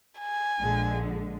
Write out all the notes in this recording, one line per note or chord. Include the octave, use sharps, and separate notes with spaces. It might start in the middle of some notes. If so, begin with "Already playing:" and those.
G#5
A#1 D3 G#3